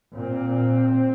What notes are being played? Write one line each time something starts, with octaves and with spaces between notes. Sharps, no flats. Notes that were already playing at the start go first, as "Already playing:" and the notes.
A#2 C4